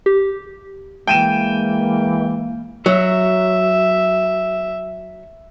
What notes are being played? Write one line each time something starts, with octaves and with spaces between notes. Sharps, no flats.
G4
E3 G#3 A#3 G5 D#7 E7
F#3 E5